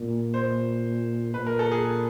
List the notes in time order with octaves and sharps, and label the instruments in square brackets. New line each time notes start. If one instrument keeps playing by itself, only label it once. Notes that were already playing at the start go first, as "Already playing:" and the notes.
Already playing: [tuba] A#2
[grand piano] C5
[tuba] A#2 [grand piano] B4
[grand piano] A#4
A4
G#4